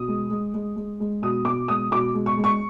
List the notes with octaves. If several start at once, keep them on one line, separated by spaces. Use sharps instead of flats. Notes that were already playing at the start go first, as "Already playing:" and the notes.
Already playing: B2 D#6
G#3
G#3
G#3
G#3
G#3
B2 D#6
B2 D6
G#3 D#6
B2 D6
G#3
C#6
G#3
C#6